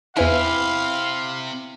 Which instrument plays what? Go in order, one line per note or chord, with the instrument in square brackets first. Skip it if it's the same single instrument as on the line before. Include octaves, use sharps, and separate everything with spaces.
[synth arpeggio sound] E2 B4 G#5 [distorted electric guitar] C3 [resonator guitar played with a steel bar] E4 [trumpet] F5